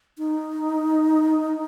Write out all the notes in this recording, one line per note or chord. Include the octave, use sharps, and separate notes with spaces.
D#4